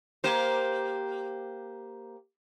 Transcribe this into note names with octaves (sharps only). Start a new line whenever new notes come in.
A#3 G4 C5